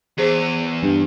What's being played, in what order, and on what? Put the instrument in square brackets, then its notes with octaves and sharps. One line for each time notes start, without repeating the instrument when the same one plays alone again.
[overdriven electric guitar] E2 [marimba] G#4 C5
[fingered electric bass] G2